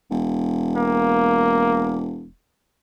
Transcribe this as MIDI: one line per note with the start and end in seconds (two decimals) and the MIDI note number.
0.11 2.30 28
0.76 2.09 58